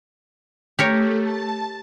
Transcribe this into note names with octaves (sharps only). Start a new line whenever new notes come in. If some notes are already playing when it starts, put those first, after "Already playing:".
A3 G4 A#4 C#5
A5